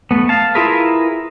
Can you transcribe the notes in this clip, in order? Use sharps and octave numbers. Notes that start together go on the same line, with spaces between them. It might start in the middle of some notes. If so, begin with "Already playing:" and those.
A3 B3
F5 A5
E4 F4 G#4 A#4 B4